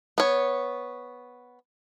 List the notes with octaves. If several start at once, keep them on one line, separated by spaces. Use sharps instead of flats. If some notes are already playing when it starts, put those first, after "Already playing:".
B3 C#5